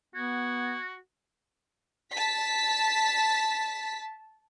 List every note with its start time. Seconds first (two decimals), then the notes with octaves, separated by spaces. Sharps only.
0.15 B3 F#4 G#6
2.12 A5 B6